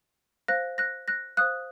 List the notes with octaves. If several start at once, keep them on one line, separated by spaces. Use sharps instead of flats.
C5 F5 F#6 A#6
F#6 A#6
F#6 A#6
C5 F5 D#6 F#6